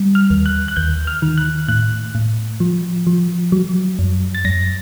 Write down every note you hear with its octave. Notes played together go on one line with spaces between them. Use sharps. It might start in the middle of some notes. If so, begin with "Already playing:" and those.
Already playing: G3
F6
D#2
F#6
F#6
D#2 G6
F6
D#3
F#6
A2 F#6
A2
F3
F3
F#3
F#2
A6
F#2 A#6